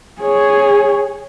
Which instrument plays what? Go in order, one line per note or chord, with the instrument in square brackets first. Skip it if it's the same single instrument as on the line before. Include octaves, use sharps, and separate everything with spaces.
[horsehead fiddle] G#4 C#5